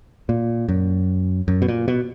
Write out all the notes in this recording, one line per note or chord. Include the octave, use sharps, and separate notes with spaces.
A#2
F#2
F#2
B2
A#2
B2